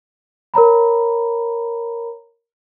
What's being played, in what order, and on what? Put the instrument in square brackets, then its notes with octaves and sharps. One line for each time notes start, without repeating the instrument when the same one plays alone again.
[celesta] A#4 C#5 A#5 B5